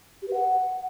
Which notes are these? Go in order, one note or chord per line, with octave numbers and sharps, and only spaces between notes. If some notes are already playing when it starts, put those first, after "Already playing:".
G4
B4
F#5